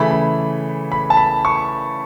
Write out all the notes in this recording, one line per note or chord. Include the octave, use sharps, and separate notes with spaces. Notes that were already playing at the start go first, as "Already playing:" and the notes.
Already playing: C#3 E3 A3 E4 B5
B5
B5
A5
B5
C#6